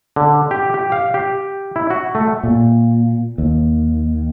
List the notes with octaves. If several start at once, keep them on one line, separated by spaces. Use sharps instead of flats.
D3
G4
G4
F5
G4
E4
F#4
A3
A#2
D#2